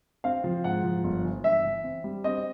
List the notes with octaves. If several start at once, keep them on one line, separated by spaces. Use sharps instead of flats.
C4 F5
F3
G#2 F#5
F3
G1
E3
G1 E5
E3
C4
G3
C4 D#5